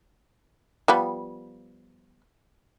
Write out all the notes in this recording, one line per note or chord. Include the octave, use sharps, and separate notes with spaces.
F3 G3 B3